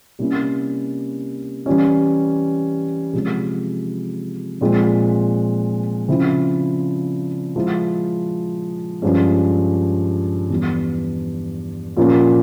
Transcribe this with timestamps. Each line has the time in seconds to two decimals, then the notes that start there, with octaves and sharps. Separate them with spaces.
0.19 C3 G3 A#3 C#4 E4
1.66 E3 G3 C#4
3.13 C3 F3 G#3
4.61 A#2 F3 G#3 C4
6.08 C#3 F3 C4 E4
7.56 F3 G#3 E4
9.02 G2 F3 G#3 C#4
10.49 E2 E3 G3
11.96 A#2 F3 A#3 C#4 F4